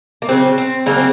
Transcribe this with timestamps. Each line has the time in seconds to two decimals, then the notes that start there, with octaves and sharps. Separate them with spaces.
0.22 A#3
0.28 C#3 F#3 C4
0.58 C4
0.86 C#3 F#3 A#3
0.97 C4